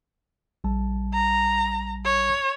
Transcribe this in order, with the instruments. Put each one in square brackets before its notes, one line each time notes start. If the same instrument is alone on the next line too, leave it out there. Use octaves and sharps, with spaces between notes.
[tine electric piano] A#1 G3 A5
[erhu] A#5
C#5